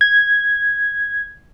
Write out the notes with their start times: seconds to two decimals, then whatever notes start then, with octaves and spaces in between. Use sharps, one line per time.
0.01 G#6